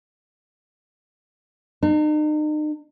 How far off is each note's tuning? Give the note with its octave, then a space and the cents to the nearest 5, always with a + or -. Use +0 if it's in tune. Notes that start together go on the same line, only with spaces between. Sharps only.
D#4 -40